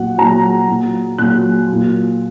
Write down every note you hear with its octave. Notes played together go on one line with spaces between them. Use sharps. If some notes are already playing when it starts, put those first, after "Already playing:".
Already playing: A#2 F#3 F#5
A#2 F#3 A#5
A#2 F#3
A#2 F#3 F#6
A#2 F#3